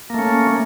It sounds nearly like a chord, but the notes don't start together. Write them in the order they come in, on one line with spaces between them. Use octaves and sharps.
A#3 A3 C#4